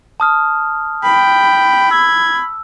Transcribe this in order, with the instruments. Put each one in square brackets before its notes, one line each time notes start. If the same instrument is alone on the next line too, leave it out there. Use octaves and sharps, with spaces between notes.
[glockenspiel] A5 D#6 F6
[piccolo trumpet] G5 [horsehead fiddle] B5
[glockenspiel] E6 [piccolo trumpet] G#6